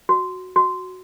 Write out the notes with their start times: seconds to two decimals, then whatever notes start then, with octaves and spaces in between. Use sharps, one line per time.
0.09 F#4
0.56 F#4